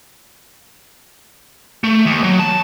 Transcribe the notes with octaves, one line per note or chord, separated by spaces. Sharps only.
A3
D#2
F#3
A5